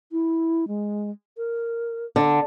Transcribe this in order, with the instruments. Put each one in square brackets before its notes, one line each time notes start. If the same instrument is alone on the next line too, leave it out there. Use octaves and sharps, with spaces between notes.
[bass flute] E4
G#3
A#4
[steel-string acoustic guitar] D3